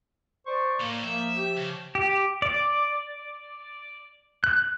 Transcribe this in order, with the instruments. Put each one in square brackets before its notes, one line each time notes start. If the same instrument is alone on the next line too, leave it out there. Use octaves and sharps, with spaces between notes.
[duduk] C5 [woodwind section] D5 C#6
[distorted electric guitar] A2 [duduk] A#3
[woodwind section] F3 [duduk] A#3 [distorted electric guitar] E5
[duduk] G4
[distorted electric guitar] C#3
[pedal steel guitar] G4
D5
F#6